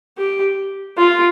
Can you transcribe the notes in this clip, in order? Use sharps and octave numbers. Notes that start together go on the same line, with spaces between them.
G4
F4